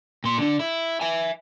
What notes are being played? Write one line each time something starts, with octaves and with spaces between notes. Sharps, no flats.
A#2 C6
D3 D4
E4
E5 G#5